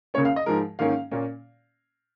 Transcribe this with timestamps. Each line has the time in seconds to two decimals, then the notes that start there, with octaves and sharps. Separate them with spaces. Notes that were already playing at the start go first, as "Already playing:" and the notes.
0.14 C#2 C#3 A#3 C#4 C#5
0.25 F5
0.36 D#5
0.46 G#2 F3 G#3 A#4
0.79 G#2 D#3 A#3 C#4 F5
1.11 A#2 A#3 C#4